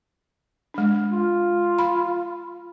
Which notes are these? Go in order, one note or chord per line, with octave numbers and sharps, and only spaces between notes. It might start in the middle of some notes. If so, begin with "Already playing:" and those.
G#3 D4
F4
B5